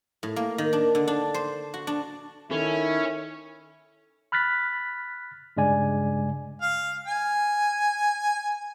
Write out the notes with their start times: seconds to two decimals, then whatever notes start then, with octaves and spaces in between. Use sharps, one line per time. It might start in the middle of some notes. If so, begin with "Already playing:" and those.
0.23 A2
0.36 A#3
0.58 D#3
0.73 D4
0.95 D3
1.08 D4
1.34 C5
1.74 F#4
1.87 D4
2.51 D#3 C#4 E4 A4
4.32 B5 F6 F#6 A6 B6
5.57 G2 C#3 G#3 D5 G#5
6.61 F5
7.06 G#5